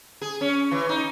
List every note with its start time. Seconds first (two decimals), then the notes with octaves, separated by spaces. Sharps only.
0.21 G#4
0.41 C#4
0.71 E3
0.89 D#4